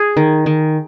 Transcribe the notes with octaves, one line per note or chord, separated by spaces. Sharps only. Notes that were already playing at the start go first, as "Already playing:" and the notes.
Already playing: G#4
D#3
D#3